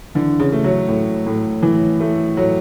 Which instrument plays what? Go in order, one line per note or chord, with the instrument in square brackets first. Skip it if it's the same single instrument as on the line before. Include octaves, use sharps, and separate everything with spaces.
[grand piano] D3 [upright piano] E3
[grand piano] C#3
[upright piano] A3
[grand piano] F#3
[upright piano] A2
A2
E3
A3
[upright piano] A2 [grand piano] F#3